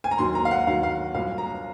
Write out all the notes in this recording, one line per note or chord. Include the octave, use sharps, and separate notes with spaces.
G#5
A#5
D#2 D#3 F#3 C6
A#5
F5
F#5
D#2 D#3 F#3 F5
F5
C2 A#2 F#3 F5
A#5